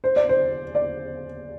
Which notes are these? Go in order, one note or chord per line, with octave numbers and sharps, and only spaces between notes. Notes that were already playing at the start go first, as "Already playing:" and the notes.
C5
D5
C5
D5